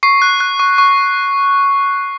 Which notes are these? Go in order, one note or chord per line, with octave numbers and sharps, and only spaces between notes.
C#6 C7
F#6
F#6
C#6
C#6